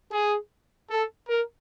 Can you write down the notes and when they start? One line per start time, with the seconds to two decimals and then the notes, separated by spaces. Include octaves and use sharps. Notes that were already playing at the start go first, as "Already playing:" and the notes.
0.11 G#4
0.90 A4
1.29 A#4